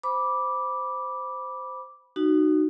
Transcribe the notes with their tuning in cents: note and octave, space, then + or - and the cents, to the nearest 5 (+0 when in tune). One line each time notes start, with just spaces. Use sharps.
C5 -10 B5 -15 D6 -5
D#4 -20 F#4 +15